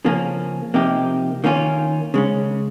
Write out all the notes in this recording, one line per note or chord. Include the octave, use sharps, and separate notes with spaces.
C#3 F3 A#3 C#4
C3 F3 A#3 D#4 G4
D#3 A#3 C#4 F4
C#3 G#3 C#4